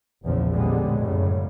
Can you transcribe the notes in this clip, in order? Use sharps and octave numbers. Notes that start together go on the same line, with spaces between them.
F1 A#1 E2 C#3 F3
A1 A#2 D3 G3 G#3 B3
F#2 A2 C#3 G3